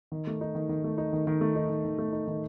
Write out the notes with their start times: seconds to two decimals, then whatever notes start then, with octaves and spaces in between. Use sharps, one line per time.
0.12 D#3
0.27 A3
0.41 D#4
0.55 D#3
0.69 D#3
0.84 A3
0.98 D#4
1.13 D#3
1.27 D#3
1.41 A3
1.56 D#4
1.70 D#3
1.85 D#3
1.98 A3
2.12 D#4
2.27 D#3